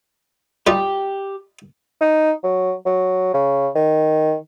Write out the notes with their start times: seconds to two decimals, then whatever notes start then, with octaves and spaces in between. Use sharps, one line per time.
0.67 G3 D#4 F4 G4
2.01 D#4
2.44 F#3
2.86 F#3
3.34 C#3
3.75 D#3